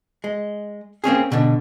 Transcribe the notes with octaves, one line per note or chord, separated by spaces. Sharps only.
G#3
A#3 C4 C#4 G#4
B2 D3